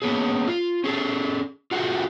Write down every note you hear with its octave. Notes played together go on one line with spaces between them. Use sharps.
A#3 B3 C#4 G#4
F4
C#4 G#4 A4
F4 F#4 G#4 A4